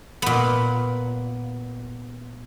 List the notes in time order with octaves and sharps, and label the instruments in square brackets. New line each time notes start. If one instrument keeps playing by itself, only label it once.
[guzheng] A#2 B3